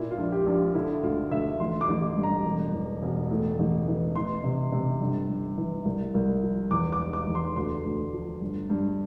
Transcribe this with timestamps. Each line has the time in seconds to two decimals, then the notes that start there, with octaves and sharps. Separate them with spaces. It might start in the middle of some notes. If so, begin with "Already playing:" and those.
Already playing: A#2 E4
0.11 F4
0.18 A#1
0.32 G4
0.46 A#1
0.53 F4
0.74 D3 E4
1.03 D2 F4
1.31 D2 E5
1.60 A1 C6
1.81 D6
1.88 A1
2.16 G2
2.23 A#5
2.45 E1
2.74 E2
3.02 E1
3.30 A2
3.59 A1
3.87 E3
4.15 E3 C6
4.44 C3
4.72 C3
5.01 G1
5.29 G1
5.57 E3
5.85 C2
6.14 C2
6.42 F3
6.71 E2 D6
6.92 D6
6.99 E2
7.13 D6
7.27 E2
7.35 C6
7.56 D2 C6
7.84 D2
8.13 F3
8.41 G1
8.70 G2